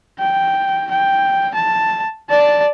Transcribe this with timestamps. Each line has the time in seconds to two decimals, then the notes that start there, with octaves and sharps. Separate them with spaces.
0.19 G5
0.91 G5
1.55 A5
2.30 D5 A5